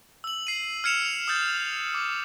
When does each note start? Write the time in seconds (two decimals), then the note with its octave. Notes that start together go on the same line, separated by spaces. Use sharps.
0.24 E6 F#7
0.47 C7 D#7
0.84 F6 G#6 C#7 E7 F7
1.05 F7
1.28 D#6 E6 G6 A6
1.94 D6